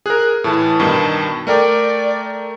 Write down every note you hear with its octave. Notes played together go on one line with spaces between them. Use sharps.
G#4 A#4 F#6
A2 E3 A5
G2 B2 D#3
A3 A#4 D5 G5